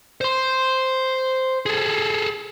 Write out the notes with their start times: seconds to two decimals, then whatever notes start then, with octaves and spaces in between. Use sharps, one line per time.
0.21 C5 C6
1.66 G#4 A4